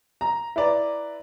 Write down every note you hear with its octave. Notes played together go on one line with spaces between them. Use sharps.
A#5
E4 B4 D5 A#5